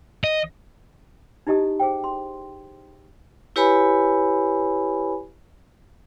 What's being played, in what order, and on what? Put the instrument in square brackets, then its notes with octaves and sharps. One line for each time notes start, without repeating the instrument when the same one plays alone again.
[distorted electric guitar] D#5
[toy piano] D#4 E4 G4 D#5 A5 D#6
G#4 C5 G5
C6
[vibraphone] E4 G4 B4 C#5 G#5 B5